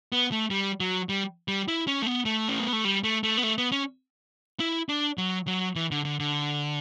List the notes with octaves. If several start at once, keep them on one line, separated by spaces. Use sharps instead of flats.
B3
A3
G3
F#3
G3
G3
E4
C#4
A3
B3
A3
C#4
B3
A3
G3
A3
A3
B3
A3
B3
C#4
E4
D4
F#3
F#3
E3
D3
D3
D3